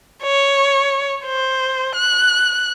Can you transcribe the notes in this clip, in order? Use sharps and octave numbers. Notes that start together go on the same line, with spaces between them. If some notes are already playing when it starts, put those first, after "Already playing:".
C#5
C5
F#6